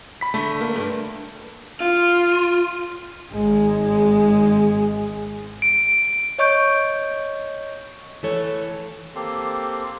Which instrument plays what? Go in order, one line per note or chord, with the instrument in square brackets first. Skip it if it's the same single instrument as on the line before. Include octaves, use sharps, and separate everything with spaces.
[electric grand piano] B5 B6
[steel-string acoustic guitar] D3 [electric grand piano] A3
[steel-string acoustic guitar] A#3
G2 D3
[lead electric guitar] F4
[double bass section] G#1 [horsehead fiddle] G#3
[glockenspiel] D7
[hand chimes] C#5 D#5 C#6 G6 D7
[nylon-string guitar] E3 A3 A4 C#5
[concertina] A#3 C4 G4 A4 C6